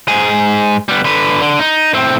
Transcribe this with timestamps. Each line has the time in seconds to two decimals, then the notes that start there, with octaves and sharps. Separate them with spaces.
0.08 G#2 G#4
0.89 G3 B3
1.05 D3 B4
1.42 D3
1.59 D#4
1.94 A2 C4